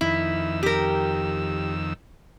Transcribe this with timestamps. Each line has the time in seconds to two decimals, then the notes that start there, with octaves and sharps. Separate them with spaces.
0.01 F2 D#3 E4 E6
0.63 G4 A#4